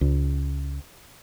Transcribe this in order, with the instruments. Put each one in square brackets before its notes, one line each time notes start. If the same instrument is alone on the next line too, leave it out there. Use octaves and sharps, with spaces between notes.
[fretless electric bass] C#2